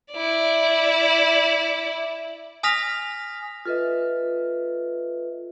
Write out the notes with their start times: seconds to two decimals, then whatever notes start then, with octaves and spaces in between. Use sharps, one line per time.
0.12 E4 D5
2.63 G#5 D#6 F6 A#6 B6 F7
3.65 F4 A4 B4 D#5 E5